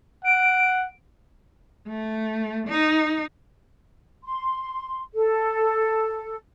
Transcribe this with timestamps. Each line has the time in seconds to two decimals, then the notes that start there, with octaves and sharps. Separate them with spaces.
0.24 F#5 D7
1.88 A3
2.68 D#4
4.24 C6
5.14 A4